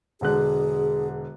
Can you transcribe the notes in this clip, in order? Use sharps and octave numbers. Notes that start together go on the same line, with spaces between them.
E1 D3 G#4 F#6